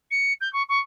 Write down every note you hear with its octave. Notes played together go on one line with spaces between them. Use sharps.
C#7
G6
C#6
C#6